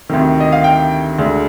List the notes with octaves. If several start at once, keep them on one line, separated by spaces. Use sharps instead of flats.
D2 C3 D#3
D#5
F5
G5
D2 D3 G#3